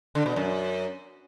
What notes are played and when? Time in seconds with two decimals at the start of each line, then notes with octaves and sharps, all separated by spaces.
0.15 D3
0.26 B2
0.36 F#2